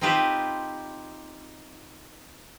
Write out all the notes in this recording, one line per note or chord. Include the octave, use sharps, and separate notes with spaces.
C4 D#4 F4 G4 B4 C5